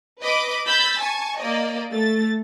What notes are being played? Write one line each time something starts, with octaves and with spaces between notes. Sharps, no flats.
B4 D#5 B5 D6
B5 E6 G6 A6 B6
G#5 A5 C#6
A#3 D5 D#5
A3 A6